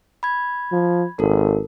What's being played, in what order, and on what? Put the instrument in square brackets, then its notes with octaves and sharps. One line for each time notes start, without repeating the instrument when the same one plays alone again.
[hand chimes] B5 G#6
[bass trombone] F3
[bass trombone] G#1 [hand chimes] A4 A#4